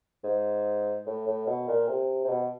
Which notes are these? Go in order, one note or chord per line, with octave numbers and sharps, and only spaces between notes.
G#2
A2
A2
B2
A#2
C3
C3
B2